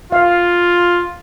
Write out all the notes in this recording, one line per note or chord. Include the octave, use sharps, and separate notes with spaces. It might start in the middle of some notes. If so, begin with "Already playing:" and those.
F4 F5